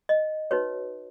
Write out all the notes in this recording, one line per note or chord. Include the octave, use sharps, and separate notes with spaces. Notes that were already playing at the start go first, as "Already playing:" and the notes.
D#5
D#4 F#4 B4 C#5